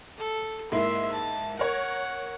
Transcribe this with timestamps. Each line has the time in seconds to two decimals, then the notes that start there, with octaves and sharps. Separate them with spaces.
0.18 A4
0.72 G#2 A#3 E4 E5 C6
1.13 A5
1.59 A#4 C#5 F#5